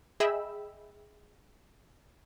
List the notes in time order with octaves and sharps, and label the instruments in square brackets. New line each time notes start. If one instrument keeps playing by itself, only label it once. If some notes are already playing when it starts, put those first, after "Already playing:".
[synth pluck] G#4 D#5 E5 G5 B5 E6